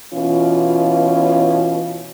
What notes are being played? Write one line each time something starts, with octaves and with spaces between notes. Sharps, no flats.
B2 E3 C#4 F4